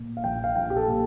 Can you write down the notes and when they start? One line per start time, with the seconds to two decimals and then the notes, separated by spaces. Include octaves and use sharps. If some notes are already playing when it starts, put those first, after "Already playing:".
Already playing: A#2
0.17 F5
0.24 A#1 G5
0.44 F5
0.56 A#1 G5
0.70 G4
0.76 A4
0.87 A#2